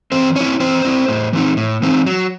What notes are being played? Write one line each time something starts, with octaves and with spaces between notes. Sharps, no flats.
E3 C4 C5
C4 C#4 E4 C#5
E3 C4 C5
C4 E4
A2
E3 C4 D#4
A2
E3 C4 D#4
F#3